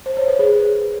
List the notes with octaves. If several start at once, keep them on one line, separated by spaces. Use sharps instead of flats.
C5
C#5
B4
G#4